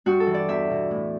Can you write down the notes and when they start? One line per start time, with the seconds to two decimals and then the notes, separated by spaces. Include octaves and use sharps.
0.06 G2 F#4
0.20 A4
0.27 E3
0.34 D5
0.48 E2 E5
0.70 B2
0.91 A2